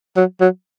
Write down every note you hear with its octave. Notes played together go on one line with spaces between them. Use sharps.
F#3
F#3